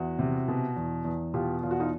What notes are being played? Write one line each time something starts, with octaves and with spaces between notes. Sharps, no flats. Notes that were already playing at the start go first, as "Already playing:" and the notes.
Already playing: E2 E4 F#4
C3
B2
E2
E2
B2 F4 G4
E2 F4
F#4
D#4 F4